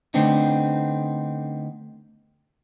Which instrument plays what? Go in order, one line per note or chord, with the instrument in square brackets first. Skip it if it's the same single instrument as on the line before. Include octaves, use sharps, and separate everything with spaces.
[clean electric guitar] D3 A3 B3 C4 D4 D#4